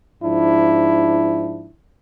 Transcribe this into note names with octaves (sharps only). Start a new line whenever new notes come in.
G#2 F3 D4 E4